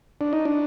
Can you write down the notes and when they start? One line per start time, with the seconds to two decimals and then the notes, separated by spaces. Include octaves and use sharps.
0.21 D4
0.33 D#4
0.45 D4